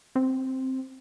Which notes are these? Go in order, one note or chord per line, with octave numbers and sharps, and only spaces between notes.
C4